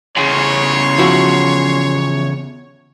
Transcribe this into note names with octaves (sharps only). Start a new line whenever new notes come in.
E2 C#3 C#5 C6
F3 E4 F#4